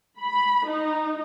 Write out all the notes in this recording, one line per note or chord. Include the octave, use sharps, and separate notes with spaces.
B5
D#4